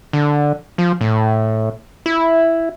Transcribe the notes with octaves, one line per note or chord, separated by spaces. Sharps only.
D3
F3
A2
E4